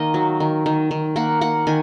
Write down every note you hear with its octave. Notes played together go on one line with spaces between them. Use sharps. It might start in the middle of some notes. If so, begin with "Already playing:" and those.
Already playing: D#3 A#3 D#5
F#3
D#3
D#3
D#3
A#3 F#5
A#3 F#5
D#3 G#5